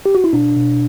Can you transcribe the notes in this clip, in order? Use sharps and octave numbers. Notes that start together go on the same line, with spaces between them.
G4
F#4
E4
B2 D4
B2